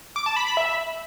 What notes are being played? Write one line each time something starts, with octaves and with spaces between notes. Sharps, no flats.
D6
A5
B5
B5
E5